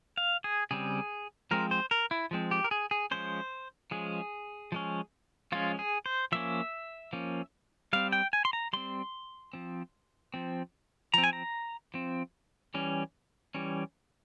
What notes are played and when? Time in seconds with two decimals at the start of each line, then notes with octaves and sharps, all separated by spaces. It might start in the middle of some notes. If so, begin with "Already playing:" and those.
0.17 F5
0.44 G#4
0.71 C#3 G3 C4 G#4
1.51 F3 G#3 C4 A#4
1.71 C5
1.91 A#4
2.11 E4
2.31 F3 G#3 C4
2.51 G4
2.64 A#4
2.71 G#4
2.91 G#4
3.11 F3 G#3 C#4 C5
3.91 F3 G#3 C#4 G#4
4.72 F3 G#3 C#4
5.52 F3 G#3 C#4 F4
5.79 G#4
6.06 C5
6.32 F3 A#3 C#4 E5
7.13 F3 A#3 C#4
7.93 G3 C4 F5
8.12 G5
8.33 G#5
8.45 C6
8.53 A#5
8.73 G3 C4 C6
9.53 F3 C4
10.34 F3 C4
11.14 F3 C4 A#5
11.23 G#5
11.33 A#5
11.94 F3 C4
12.74 E3 G3 C#4
13.55 E3 G3 C#4